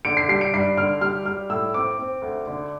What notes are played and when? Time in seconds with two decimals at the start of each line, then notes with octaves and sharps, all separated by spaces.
0.05 D3 D7
0.17 C7
0.28 G3 C7
0.41 D7
0.54 G2 C7
0.77 D3 F6
1.01 G3 F6
1.25 G3 F6
1.49 A2 E6
1.74 C4 D6
1.98 C4
2.22 D2
2.47 D3